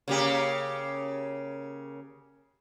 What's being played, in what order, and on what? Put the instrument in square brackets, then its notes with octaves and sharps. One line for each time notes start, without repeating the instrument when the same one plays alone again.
[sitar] C#3 A#3 G4